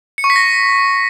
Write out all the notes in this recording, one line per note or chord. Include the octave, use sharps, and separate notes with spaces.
C#7
C#6
B6
A#6